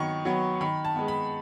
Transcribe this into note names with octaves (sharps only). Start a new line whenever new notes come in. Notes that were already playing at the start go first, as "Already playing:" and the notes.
Already playing: D#3 F#3 B3 C#6
F#3 B3
D#3 B5
A5
G#3 B3
B5